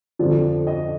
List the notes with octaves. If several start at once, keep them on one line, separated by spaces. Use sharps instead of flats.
F2 D3 F3 D5
D#5